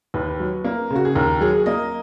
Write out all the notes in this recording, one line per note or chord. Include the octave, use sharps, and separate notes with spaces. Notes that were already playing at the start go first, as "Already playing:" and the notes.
D#2 B4
F#3
A#3
C#3
F#4
G#4
D#2 A#4
F#3 G#4
A#3 D#5